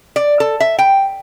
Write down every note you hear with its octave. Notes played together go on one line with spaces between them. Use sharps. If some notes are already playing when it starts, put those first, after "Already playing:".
D5
A4
E5
G5